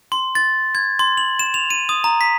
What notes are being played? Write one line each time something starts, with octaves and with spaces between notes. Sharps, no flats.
C6
A6
G#6
C6
F#7
E7
F7
D#7
D#6
A#5
B6